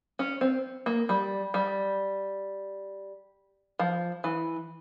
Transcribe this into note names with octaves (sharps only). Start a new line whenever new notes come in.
C#4
C4
A#3
G3
G3
F3
E3